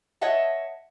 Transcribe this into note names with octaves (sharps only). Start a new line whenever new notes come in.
C#5 D#5 E5 F#5 A5